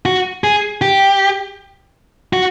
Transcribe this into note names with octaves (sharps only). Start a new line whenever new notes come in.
F#4
G#4
G4
F#4